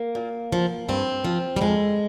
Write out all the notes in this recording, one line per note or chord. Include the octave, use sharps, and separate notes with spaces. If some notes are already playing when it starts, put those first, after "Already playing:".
Already playing: A#3
A#2
F3
G2 C4
F3
G3
F2 G#3